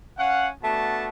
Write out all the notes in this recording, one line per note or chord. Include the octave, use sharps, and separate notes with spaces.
C#4 F5 F#5
A3 B3 D4 F#4 A5